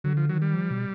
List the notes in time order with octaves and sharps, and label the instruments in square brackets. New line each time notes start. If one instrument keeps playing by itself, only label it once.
[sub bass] D3 [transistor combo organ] F#3
[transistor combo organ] F3
[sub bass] D#3 [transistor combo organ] F#3
[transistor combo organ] G3
[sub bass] F3
B2